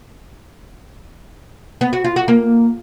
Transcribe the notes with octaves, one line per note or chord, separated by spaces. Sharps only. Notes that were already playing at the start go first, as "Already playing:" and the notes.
B3
F#4
F4
F#4
A#3